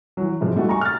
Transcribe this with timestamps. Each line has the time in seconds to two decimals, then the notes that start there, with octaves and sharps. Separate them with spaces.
0.17 E3 F#3
0.41 G#2 C3 F3
0.55 G3 A3 D#4 F#4
0.68 G#5 A#5 C#6
0.81 F6 A6